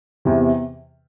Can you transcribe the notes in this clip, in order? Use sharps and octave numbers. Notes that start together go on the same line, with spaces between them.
E2 C3 E3